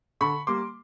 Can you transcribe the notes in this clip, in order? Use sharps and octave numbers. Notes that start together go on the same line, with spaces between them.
D3 B5 C#6
G3 A#3 C6 D6